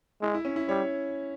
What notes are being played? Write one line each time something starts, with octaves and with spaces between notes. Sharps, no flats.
G#3 E4
E4
C#4
E4
G3 C#5